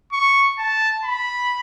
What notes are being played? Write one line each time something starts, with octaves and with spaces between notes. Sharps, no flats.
C#6
A5
B5